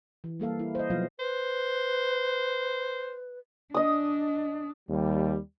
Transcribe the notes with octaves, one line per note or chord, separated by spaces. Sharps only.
E3
G3 A#3 A4 F5
E4
C5 D#5
B2 F3 F#3 B3 F4 F5
B4 C5
D4 D#5 D#6
D#2 G3